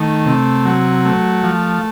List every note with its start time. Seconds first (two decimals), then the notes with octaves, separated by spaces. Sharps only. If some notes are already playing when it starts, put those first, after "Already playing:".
Already playing: D#3 A3
0.26 C3
0.65 F#3
1.05 A3
1.43 F3